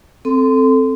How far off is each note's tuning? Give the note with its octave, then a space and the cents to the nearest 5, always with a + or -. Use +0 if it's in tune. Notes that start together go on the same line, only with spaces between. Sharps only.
C4 +0 A4 +0 C6 -25